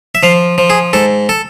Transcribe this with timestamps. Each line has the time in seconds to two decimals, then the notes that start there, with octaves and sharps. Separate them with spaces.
0.15 E5
0.23 F3 F5
0.58 F3
0.70 G#4
0.93 G#2 A4
1.29 A4